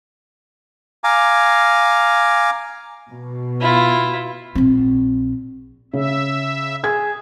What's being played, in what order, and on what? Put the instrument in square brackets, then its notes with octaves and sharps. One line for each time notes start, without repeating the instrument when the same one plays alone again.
[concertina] F5 G#5 A#5 D6
[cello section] B2
[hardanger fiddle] E4 F4
[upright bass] A#1 C4
[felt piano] C#3 [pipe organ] E5
[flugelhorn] G#4 [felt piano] G#6